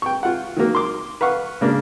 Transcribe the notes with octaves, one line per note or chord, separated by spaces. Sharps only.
G5 C#6
F4 F#5
D#3 F#3 A#3
C6 D6
B4 F5 F#5 C#6
C#3 A#3 D4